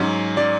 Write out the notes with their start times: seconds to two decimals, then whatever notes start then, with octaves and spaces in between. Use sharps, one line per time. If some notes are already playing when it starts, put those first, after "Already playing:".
Already playing: G#2 F#3 C#4
0.37 F#3 C#4 D5